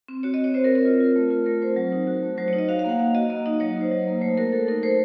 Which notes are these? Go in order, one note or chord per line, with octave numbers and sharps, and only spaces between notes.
C4
F#4 C#5
D#5
F#4
C#5
C4 C5
A#4
C4
A#4
F4
F4
A3
F4
A3 A#4
C4 C5
F#3
D#4
F#4
A3
F#3 C5
C#5
D#4
D#5
F#4 F5
F5
A#3 F#5
A#3 F5
F#4 D#5
A#3 D#5
D#4 D#5
F#3 C#5
D#4
C5
F#3
A#3
A3 C5
F#4 A#4
A3 A4
D#4 A#4
A3 C5